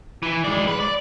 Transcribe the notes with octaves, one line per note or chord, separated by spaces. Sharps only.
E3
G#3 D5
B4
D5